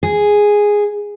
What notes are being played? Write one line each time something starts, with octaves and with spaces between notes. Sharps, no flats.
G#4